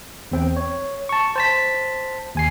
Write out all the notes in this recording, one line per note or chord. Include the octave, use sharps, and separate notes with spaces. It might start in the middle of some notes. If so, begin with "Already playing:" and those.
E2 C4 G5
C#5
A5 C#6
C5 A5 B6
D#2 G#5 C7